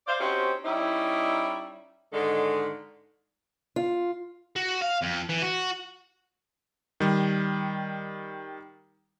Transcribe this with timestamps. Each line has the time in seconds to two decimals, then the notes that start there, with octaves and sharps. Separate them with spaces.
0.07 C5 D5 F5
0.20 C4 C#4 D#4 F#4 G4 C5
0.65 G3 C#4 D#4 E4
2.13 G#2 D3 D#3 G#3 A4
3.76 F4
4.56 F#4
4.82 F5
5.03 F2
5.29 E3
5.42 F#4
7.00 D#3 G3